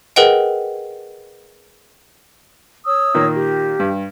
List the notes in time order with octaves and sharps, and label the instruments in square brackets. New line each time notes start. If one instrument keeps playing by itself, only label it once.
[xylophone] G#4 A#4 B4 D#5 F#5 G5
[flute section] C#5 D#6 E6
[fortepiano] A#2 D#3 A#3
[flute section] G4
[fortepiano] G2